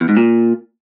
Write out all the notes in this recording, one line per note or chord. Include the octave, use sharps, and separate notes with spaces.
E2
G#2
A#2